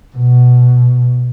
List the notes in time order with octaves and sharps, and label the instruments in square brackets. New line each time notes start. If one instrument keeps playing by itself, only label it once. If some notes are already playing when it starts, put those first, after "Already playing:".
[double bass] B2